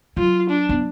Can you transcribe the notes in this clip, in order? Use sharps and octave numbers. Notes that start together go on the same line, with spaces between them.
F#3 F4
D4
B3